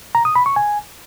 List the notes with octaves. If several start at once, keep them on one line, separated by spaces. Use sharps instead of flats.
A#5
D#6
B5
C#6
G#5